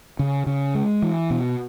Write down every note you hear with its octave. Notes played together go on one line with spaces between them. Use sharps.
C#3
C#3
G#3
E3
B2